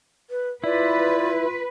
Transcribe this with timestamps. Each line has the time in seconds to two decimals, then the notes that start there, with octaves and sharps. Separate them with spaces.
0.30 B4
0.64 E4 F4 B4 D5